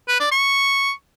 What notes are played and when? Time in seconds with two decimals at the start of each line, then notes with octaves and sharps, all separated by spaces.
0.08 B4
0.20 D5
0.32 C#6